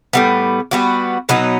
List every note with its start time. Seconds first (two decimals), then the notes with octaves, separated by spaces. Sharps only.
0.13 A2 G3 B3
0.71 G3 B3 F#4
1.29 B2 F#3 B3 D#4